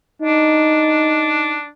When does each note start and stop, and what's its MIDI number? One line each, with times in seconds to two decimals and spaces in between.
0.22 1.68 62
0.22 1.58 63